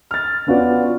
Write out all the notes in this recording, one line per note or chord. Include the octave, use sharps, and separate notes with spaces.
F6 A6
B3 C#4 F4 F#4 B4 D5